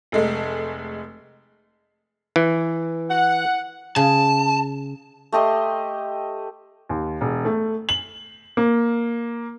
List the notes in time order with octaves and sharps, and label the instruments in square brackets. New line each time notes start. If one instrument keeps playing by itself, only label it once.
[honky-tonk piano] F1 G#3 A3
[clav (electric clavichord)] E3
[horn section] F#5
[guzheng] C#3 [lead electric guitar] A5
[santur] A3 G4 D#5 C6
[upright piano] D#2
E1
A3
F#7
A#3